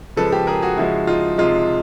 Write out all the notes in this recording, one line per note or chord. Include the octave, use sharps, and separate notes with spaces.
C#3 F3 G#3 A4 B4
G4 A4
G#4 A#4
F#4 G#4
C#3 F3 G#3 E4 F#4
D#4 F4
C3 F3 G#3 D#4 F4